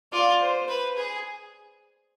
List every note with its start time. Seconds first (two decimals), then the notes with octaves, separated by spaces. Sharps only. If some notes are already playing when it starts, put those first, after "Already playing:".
0.12 F4 D5
0.41 C5
0.68 B4
0.97 G#4